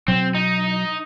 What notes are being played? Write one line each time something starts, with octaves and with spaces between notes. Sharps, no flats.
B2 F#3 C4
D#4